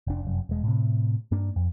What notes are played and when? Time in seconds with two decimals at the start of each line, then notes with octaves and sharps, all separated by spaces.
0.07 F1 D4
0.23 F1 F#2
0.49 E1 G#3
0.63 A2 C3
1.31 G2 A#3 D4
1.56 F2